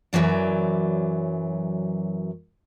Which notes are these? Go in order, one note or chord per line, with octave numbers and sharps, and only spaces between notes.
F#2 C#3 E3 F#3 D5